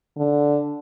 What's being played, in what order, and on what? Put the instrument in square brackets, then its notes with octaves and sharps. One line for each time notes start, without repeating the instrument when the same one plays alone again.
[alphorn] D3